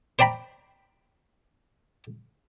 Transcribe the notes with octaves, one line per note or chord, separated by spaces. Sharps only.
C5 D5 G5 A#5 B5